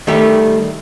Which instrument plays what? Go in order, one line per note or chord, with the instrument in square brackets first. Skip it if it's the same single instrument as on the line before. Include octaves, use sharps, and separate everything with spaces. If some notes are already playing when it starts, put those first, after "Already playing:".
[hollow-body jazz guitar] D#3 G3 A3 G4